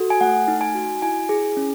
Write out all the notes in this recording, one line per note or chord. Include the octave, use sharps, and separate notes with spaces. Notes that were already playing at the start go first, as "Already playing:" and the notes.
Already playing: F#4 A4
G#5
A3 F#5
D#4
G#5
F#4
E4 G#5
G#4
C#4